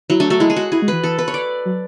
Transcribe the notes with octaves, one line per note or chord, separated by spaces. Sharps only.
F#3 E4
A3 D4
A3 F#4
G#3 E4
G#4
F#4
E4 G#4
G#3
E3 B4
E3 A4
B4
C#5
D5
F#3